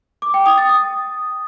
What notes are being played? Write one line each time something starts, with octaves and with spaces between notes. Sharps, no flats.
D6
G5
D#6
A6
D#6